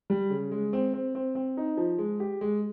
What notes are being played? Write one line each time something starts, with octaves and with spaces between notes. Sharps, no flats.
G3
C#3
G#3
C4
C4
C4
C4
D#4
F3
G#3
G4
G#3